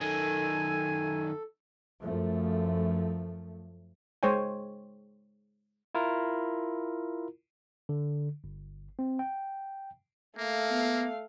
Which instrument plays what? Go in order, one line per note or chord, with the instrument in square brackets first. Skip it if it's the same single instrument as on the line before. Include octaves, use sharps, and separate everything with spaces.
[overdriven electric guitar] F#2 D#3 [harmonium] A4 [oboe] G#5
[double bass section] F#2 F3 A3
[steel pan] G#3 C5 C#5 G5 G#5
[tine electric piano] E4 F4 A#4
D3
G1
C4
G5
[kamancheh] A3 F5 [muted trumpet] A#3
[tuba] B3